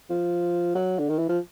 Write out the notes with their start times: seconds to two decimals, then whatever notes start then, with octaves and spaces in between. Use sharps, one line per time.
0.10 F3
0.75 F#3
0.99 D3
1.09 D#3
1.18 E3
1.29 F3